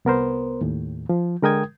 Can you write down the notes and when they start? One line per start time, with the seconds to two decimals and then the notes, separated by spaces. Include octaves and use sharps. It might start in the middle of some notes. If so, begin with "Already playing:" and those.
0.05 C2 B3 A#4 C5
0.61 D#2 A2
1.09 F3
1.42 D3 G#3 A#4 G5 D#6 G#6